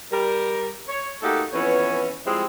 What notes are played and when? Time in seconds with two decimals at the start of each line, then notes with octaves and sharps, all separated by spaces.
0.11 G3 A#4
0.87 C#5
1.22 A3 A#3 D#4 F#4 G4 A4
1.53 F2 E3 B3 C#4 E4 C#5
2.26 F3 G3 G#3 C4 E4